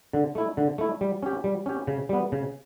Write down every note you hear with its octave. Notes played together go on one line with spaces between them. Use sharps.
D3
A3 E4
D3
A3 E4
G3
C#4 G4
G3
C#4 G4
C#3
G3 B3
C#3